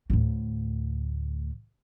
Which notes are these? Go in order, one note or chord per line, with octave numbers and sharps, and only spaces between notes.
D2 A2